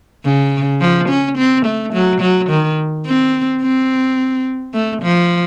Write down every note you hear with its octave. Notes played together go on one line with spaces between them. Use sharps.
C#3
F3
C#4
C4
A3
F#3
F#3
D#3
C4
C4
A3
F3